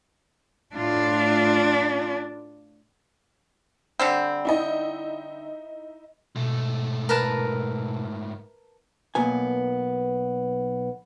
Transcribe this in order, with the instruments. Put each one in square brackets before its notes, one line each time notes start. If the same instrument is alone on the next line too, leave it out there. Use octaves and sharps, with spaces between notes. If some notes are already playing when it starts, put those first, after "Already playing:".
[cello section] A2 F4 [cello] D4
[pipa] D3 G3 C4
[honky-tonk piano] D#4 E4 D#5
[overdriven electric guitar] G#2 A3 [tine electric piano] B2
[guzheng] A#4 B4 A5
[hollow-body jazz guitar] B1 A#3 B3 G#5